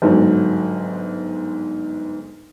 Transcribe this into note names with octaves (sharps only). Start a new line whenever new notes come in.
G1 G#2 F#3